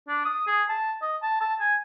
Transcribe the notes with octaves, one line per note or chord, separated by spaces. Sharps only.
D4
D#6
G#4
A5
D#5
A5
A5
G#5